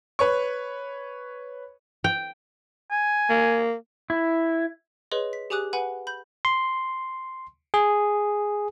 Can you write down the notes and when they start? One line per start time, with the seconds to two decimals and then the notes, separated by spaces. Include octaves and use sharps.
0.19 B4 C#5 C#6
2.04 G5
2.91 G#5
3.30 A#3
4.10 E4
5.11 G#4 B4 C#5 D#5 C6
5.33 B6
5.50 G4 G#4 G#5 D6 D#6 F#6
5.73 B4 F#5 G#5 B5
6.07 B5 G6
6.45 C6
7.74 G#4